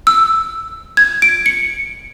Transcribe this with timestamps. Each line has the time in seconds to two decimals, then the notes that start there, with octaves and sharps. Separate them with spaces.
0.07 E6
0.97 G#6
1.22 D7
1.46 C#7